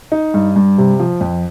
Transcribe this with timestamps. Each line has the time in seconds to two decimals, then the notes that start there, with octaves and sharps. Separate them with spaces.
0.12 D#4
0.34 G2
0.56 G2
0.78 C3
0.99 F3
1.21 F2